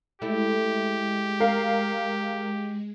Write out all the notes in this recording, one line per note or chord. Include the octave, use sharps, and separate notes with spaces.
G#3 A3 E4 G4
A#4 F5